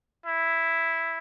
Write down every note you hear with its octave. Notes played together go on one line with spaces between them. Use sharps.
E4